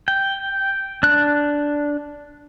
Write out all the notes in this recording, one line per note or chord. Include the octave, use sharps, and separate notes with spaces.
G5
D4 F#6